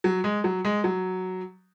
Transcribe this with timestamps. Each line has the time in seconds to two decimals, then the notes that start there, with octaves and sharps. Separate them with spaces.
0.04 F#3
0.24 G#3
0.44 F#3
0.65 G#3
0.84 F#3